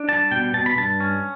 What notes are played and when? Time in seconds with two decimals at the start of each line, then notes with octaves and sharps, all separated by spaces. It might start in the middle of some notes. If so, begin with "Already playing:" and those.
Already playing: D4
0.09 G3 A5
0.31 B2 G5
0.54 B2 A5
0.66 B5
0.76 G2 A5
1.00 C#4